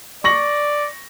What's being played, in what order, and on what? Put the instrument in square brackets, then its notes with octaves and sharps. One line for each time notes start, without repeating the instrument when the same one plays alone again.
[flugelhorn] D5 [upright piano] C#6 A#6 F#7